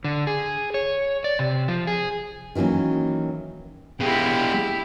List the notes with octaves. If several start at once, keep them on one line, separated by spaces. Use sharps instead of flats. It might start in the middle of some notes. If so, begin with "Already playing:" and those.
D3
G#4
C#5
D5
C3
F3
G#4
D#3 E3 F#3 A#3 C#4
G#3 B3 E4 G4